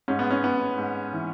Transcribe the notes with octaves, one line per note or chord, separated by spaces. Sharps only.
G#2 C#4
B3
C#4
G#2 B3
G#2
E3